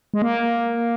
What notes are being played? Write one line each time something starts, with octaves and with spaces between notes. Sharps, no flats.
G#3
A#3